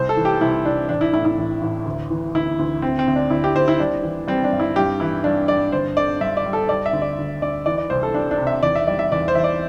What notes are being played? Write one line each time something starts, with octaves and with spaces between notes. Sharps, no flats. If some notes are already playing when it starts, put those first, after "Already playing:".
Already playing: C2 C5
A4
E3
G4
C2 E4
C2 D4
A1 D4
E4
A2 E4
E4
A1
A1
D2
E3
D2 E4
D2
D2 C4
C4
D2
D4
D2 E4
G4
D2 C5
E4
G3 D4
E3
G3 C4
D4
G2
E4
G2 G4
E3 E4
G2 D4
G2 D5
G1 C5
D3 D5
G2 E5
D5
G3
A4
G3 D5
E5
D2
D5
D2
D2 D5
E3 D5
D5
C2 C5
A4
G3 D4
D4
C3
E5
E2 D5
E5
G3 D5
E5
E2 D5
C5
E2 E5
D5